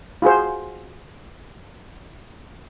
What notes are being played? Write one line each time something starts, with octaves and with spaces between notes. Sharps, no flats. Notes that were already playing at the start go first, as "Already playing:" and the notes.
F4 F#4 G#4 C5